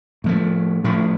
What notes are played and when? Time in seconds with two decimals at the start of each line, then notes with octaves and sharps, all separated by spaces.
0.24 A2 F3 A3
0.84 A2 F3 A3